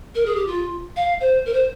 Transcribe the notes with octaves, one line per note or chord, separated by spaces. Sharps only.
A#4
G#4
G4
F4
F5
C5
A#4
C5